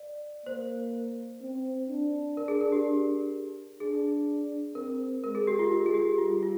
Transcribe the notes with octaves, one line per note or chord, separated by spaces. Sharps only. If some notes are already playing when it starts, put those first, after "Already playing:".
Already playing: D5
A#3 C5
C4
D4
A#4
G#4
A#4
G4
D4 G#4
C4 A#4
G#3 A#4
G#4
G4
F4
F4
G#4
G4
G3 F4
F4